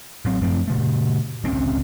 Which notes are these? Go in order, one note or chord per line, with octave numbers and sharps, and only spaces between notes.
A1 F#3 C4
F#2 F3 A3 C4
A#2 C#3 A3
D1 C#2 C4 C#4